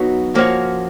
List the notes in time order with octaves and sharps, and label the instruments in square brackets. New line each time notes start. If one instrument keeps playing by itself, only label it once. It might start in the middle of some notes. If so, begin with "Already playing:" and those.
Already playing: [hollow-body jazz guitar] F#3 B3 D#4 F#4
F3 A#3 C#4 F#4